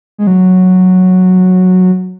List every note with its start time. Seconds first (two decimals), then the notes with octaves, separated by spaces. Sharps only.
0.18 G#3
0.27 F#3